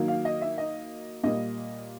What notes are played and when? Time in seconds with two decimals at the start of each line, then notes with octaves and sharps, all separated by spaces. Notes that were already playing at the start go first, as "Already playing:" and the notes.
Already playing: D#3 F#3 A#3
0.08 F5
0.25 D#5
0.41 E5
0.58 D#5
1.23 A#2 G3 A#3 D#5